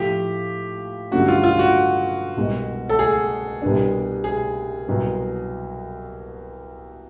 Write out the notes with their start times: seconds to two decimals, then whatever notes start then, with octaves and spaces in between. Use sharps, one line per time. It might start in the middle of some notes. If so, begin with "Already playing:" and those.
Already playing: A2 F3 A3 G4
1.11 G2 D3 F#3 A3 C#4 F#4
1.28 F4
1.44 F4
1.59 F#4
2.37 C2 B2 G#3
2.89 A4
2.99 G#4
3.62 C2 B2 G3 B3 D4
4.24 G#4
4.88 C2 B2 F#3 B3